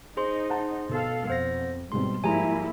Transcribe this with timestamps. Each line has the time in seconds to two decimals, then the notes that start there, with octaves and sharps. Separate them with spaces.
0.17 D#4 G#4 C5 C6
0.50 F#5 A5
0.89 B2 A4 F5
1.27 F2 B3 C5 A#6
1.92 G#2 B2 G3 C4 C6
2.24 G#2 F3 G3 A#3 E4 G#5 A#5